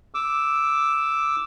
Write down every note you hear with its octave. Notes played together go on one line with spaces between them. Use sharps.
D6 E6